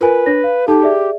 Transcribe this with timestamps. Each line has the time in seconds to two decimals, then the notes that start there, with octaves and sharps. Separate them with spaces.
0.01 F4 A#4 B4 G#5
0.26 D4 C#5 A#6
0.44 F5
0.68 D#4 G4 A4 A5
0.82 G#4 D5 E5